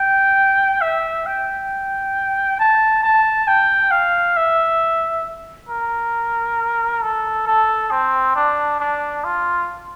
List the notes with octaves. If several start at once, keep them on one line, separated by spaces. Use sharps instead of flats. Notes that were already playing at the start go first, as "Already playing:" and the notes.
Already playing: G5
E5
G5
A5
A5
G5
F5
E5
A#4
A4
A4
C4
D4
D4
F4